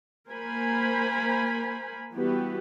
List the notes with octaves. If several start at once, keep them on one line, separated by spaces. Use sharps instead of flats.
A#3 A#4 C5 G#5 B5
E3 G3 B3 F#4 G4 B4